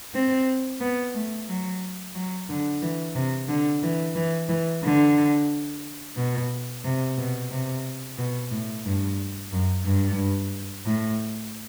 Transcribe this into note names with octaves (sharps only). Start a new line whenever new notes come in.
C4
B3
A3
F#3
F#3
D3
E3
C3
D3
E3
E3
E3
D3
B2
C3
B2
C3
B2
A2
G2
F#2
G2
A2